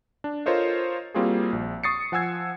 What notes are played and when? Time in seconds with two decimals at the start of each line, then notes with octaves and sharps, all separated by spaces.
0.24 D4
0.46 F4 A4 A#4 C5 C#5 D#5
1.15 G3 A#3 C4 F4 F#4 G#4
1.53 A#1
1.84 C#6 D#6 A6 C7 C#7
2.12 F3 F#5 G#5 E6 G#6 C7